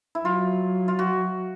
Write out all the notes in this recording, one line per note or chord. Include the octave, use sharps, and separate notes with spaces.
E4
F#3 F4
F4
F#4